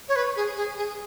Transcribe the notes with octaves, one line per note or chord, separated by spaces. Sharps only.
C#5
B4
G#4
G#4
G#4